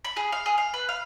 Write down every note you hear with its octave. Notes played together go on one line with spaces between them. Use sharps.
B5
G#4
F5
G#4
F5
B4
F5